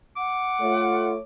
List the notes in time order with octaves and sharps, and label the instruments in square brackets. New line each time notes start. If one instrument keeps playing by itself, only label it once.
[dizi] F#5 [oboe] D6
[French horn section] A3 C#5 [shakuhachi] F4